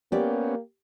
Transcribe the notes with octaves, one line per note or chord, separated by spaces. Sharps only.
A#3 B3 C#4 G4 D5